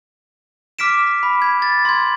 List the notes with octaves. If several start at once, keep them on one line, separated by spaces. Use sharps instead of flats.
D6 F6 B6 D7 E7
B5
G#6
A6
C6 G#6